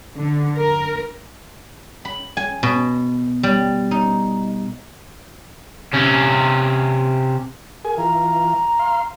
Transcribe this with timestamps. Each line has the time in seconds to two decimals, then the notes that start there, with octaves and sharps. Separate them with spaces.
0.17 D3
0.57 A#4
2.05 B5
2.37 G#5
2.63 B2
3.43 G3
3.91 D#4
5.93 C3 C#4
7.85 G#4 A#4 G#5
7.98 E3 F4 A#5
8.79 F5 C6